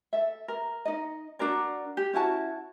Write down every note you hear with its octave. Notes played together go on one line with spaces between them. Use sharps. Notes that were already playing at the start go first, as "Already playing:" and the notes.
A4 E5
A#4
D#4 D#5
D4 F#4 A#4 D5
G4
C#4 E4 F#4 A5